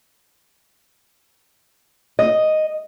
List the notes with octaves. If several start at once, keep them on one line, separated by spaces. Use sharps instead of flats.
D#5